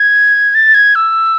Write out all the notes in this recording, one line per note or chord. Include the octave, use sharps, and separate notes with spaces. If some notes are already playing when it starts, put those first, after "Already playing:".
Already playing: G#6
A6
G#6
E6